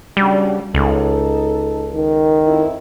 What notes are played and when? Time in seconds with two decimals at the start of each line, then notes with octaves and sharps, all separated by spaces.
0.17 C#3 G3 D4 F#4
0.75 C#2 D#4 A4
1.94 D#3
2.47 F2 E4